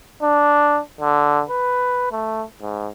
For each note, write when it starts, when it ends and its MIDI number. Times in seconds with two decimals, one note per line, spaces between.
0.23 0.80 62
1.01 1.43 50
1.49 2.07 71
2.12 2.43 57
2.61 2.88 44